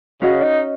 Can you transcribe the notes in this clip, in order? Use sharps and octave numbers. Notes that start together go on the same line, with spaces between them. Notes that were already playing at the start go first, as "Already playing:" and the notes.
C#3 C#4 F#4 D#5
D#4